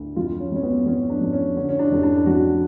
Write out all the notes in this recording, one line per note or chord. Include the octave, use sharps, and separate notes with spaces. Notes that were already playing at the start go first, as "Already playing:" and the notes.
Already playing: D2
F2 F4
C#4
F2 C#4
B3
F2 C#4
D4
F2
C#4
D3 C#4
C#4
D4
F1
D4
F2 F#4